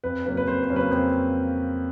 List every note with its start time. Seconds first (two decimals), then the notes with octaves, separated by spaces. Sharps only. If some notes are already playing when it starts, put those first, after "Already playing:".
0.04 F2 B4
0.25 C#3 F#3 A#3 C#4 B4
0.37 B4
0.48 F2 C5
0.63 C5
0.69 C#3 F#3 A#3 C#4
0.76 B4
0.91 F2 C5